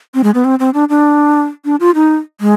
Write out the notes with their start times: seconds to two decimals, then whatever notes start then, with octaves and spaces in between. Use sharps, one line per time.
0.14 C4
0.24 G#3
0.34 B3
0.45 C4
0.59 C4
0.74 D4
0.89 D4
1.65 D4
1.80 F4
1.95 D#4
2.41 G#3